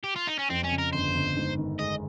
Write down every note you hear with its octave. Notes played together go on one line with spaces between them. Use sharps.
G4
F4
D#4
C#4
F2 C4
C#4
C#3
A#4
G1 C5
G1
G#2
D#3
G#3 D#5